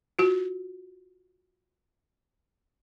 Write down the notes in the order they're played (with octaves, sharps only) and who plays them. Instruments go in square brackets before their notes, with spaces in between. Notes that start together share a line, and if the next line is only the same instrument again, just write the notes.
[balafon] F4 F#4